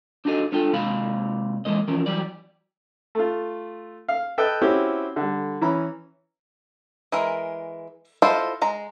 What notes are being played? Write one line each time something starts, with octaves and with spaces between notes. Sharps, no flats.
D4 D#4 F#4 G#4 A4 D#5
B3 D4 F4 A4 G5
C3 G#3 A#3 F5 B5
E3 F3 G#3 A#3 D#5
E3 F3 C#4 A#4
E3 F#3 G3 G4 D5
A3 F4
F5
A4 B4 D#5 G5
C4 C#4 E4 F#4 G4
D3 G3
E3 C#4 A#5 B5
E3 G#3 A#4
E4 F4 A4 C5 D#5
G#3 A#5